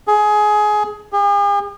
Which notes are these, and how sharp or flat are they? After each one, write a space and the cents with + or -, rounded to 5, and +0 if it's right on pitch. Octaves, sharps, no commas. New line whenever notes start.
G#4 +20
G#4 -45